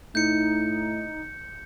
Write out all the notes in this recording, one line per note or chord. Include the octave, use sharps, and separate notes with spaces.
A2 D#4 G6 C#7